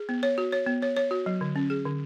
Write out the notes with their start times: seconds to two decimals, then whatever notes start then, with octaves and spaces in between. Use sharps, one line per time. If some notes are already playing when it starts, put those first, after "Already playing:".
Already playing: G#4
0.09 B3
0.23 C#5
0.38 F#4
0.52 C#5
0.67 B3
0.82 C#5
0.97 C#5
1.11 F#4
1.26 F#3
1.41 D3
1.56 C#4
1.70 G#4
1.85 D3